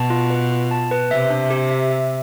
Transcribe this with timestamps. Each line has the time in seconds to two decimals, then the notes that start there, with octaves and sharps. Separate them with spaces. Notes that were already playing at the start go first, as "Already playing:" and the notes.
Already playing: B2 A5
0.10 F4
0.30 B4
0.51 F4
0.71 A5
0.91 B4
1.11 C3 E5
1.30 D4
1.50 G4
1.71 E5
1.90 E5